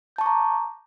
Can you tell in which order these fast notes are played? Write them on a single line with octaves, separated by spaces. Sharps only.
G6 A5 C#6 D6 A#5